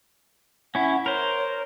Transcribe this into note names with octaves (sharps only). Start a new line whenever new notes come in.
C#4 E4 F#5
A#4 C5 C#5